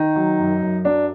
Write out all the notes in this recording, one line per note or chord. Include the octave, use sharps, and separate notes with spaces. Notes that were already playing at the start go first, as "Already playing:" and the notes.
Already playing: D#3 D#4
F#3
F#2
F#2
F#3 D4